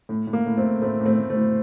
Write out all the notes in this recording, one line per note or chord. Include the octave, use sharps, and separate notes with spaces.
A2
A2
A#3
A2
A3 C4
A2
A2 A3 C4
A2
A3 C4
A2
A3 C4
A2